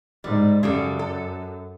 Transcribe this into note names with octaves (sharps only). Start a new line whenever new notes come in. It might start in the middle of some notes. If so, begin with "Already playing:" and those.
G#2 G3
F#2 C#3 G3 A4
A4